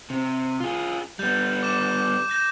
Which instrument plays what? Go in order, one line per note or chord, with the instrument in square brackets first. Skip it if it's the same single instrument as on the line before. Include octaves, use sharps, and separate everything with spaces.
[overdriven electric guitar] C3
F4 G#4
[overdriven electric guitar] G3 B3 [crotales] G6
[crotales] D6 E7
G6 A#6 E7